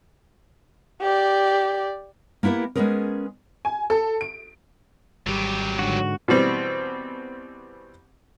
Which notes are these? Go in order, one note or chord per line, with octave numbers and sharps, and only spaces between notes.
G4 D5
A#3 B3 E4 G4 A#4
G#3 A#3 B3 C#4 G#4 A#4
G#5
A4
D7
G#1 F#3 G3 G4
G#2 D3 F#4
B2 E3 G3 C4